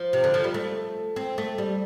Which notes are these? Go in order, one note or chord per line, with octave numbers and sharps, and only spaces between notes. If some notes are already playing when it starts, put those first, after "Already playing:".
Already playing: F3
C3
D3
F3
G3
A3
C4
A3
G3